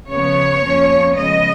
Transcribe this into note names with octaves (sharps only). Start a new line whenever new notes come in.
C#3 F3 B3 C#5
F2 F3 A#3 C#4
C#3 F3 G#3 B3 D#5